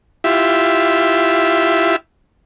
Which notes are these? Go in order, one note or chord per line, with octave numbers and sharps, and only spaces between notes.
E4 F4 G4 E5